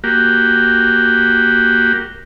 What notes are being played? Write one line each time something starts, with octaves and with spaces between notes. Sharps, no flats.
A#3 F#4 G4